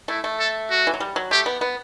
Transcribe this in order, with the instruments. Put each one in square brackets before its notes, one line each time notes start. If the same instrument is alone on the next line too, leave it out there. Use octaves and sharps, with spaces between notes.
[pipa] A3 [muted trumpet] E4
[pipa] A3
[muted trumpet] A4
F#4
[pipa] E3
F#3
G3
F#3
[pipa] A3 [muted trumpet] G4
[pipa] B3
B3